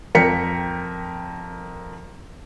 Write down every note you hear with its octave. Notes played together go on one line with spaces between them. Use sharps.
F2 A#4 G5 B6 C#7